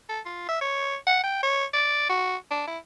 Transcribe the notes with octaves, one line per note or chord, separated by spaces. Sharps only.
A4
F4
E5
C#5
F#5
G5
C#5
D5
F#4
D4
E4